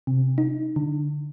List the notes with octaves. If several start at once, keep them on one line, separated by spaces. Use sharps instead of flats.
C3
D#4
D3